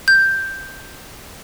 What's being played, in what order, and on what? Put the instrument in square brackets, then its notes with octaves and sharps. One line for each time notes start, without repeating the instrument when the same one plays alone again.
[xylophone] G6